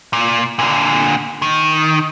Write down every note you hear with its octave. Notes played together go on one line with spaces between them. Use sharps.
A#2
A#2 D3
D#3